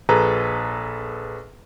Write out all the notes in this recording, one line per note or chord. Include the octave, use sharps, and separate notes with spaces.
A#1 G#4 A4 B4 A#5